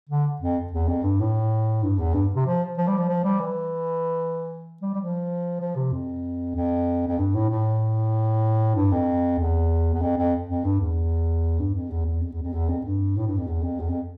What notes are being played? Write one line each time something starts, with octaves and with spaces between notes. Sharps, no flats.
D3
F2
E2
F2
G2
A2
G2
E2
G2
C3
F3
F3
G3
F3
F3
G3
E3
G3
G3
F3
F3
C3
F2
F2
F2
G2
A2
A2
G2
F2
E2
E2
F2
F2
F2
G2
E2
G2
F2
E2
E2
F2
E2
F2
E2
F2
G2
A2
G2
F2
E2
F2
E2
F2